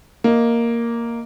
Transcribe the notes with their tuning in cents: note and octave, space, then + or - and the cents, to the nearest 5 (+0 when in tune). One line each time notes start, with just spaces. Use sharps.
A#3 +0 D#5 +0